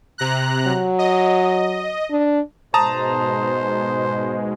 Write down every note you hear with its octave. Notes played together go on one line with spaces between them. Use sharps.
C3 A#5 F#6
F#3
D#5
D4
G#2 B2 G#3 C5 A5 A#5 D#6